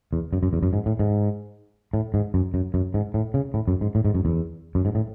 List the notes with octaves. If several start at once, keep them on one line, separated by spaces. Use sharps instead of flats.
E2
F#2
F#2
E2
F#2
G#2
A2
G#2
A2
G#2
F#2
F#2
F#2
G#2
A2
C#3
A2
F#2
G#2
A2
G#2
F#2
E2
F#2
G#2
A2